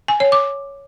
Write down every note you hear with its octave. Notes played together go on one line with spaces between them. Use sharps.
G#5
C#5
D6